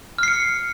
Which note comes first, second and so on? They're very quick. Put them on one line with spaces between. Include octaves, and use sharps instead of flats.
F6 C7 C#7